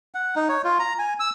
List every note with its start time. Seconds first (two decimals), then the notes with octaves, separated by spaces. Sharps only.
0.14 F#5
0.36 D#4
0.49 C#5
0.64 F4
0.79 A#5
0.99 G#5
1.20 E6